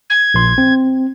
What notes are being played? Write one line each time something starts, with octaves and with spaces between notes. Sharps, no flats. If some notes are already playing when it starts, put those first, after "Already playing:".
G#6
A#1 C6
C4